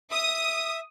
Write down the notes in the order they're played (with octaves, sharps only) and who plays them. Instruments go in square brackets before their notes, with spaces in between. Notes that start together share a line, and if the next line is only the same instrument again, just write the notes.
[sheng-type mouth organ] E5 [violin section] D#6